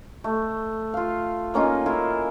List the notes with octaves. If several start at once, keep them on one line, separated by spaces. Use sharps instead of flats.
A3
F4 F5
A#3 C#4 D#4 F4
E4 F4 A#4